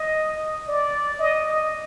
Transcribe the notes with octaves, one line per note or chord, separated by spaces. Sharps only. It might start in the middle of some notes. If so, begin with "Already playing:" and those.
Already playing: D#5
D5
D#5